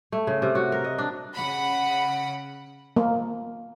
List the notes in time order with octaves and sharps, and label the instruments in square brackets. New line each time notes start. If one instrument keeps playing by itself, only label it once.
[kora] A3
C#3
C3
F#4
A#4
D#5
D4
[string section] C#3 F#5 B5
[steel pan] A#3